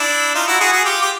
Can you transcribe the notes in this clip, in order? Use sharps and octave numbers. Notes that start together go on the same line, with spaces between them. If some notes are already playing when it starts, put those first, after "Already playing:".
Already playing: D4 E4
D#4 F4
E4 F#4
F#4 G#4
F#4 G#4
F4 G4
G4